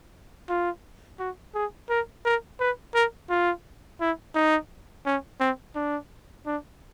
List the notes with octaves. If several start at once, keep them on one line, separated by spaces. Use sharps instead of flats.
F4
F#4
G#4
A#4
A#4
B4
A#4
F4
E4
D#4
C#4
C4
D4
D4